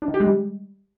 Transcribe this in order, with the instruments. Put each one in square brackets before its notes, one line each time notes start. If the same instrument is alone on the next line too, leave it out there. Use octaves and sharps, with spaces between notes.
[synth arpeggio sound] D4
D#3
G4
G#3
G3